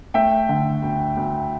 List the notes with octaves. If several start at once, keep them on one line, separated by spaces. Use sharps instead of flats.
A3 E5 G5
D3
D2
D2